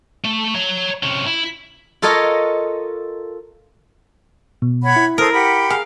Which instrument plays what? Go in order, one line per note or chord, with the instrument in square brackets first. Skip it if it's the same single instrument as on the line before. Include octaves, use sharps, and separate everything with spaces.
[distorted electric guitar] A3
C#5 A#5
C3 C#4
E4
[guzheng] F4 A4 A#4 C#5 D#5
[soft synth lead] B2
[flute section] C#5 F#5 B5
[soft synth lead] E4
[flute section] A4 C5 D#6 [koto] A#4
[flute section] G4 F#5 B5
[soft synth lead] G#4 [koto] F5